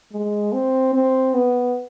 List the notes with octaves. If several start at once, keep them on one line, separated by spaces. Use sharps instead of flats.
G#3
C4
C4
B3